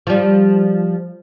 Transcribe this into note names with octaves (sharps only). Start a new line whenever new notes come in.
F3 G3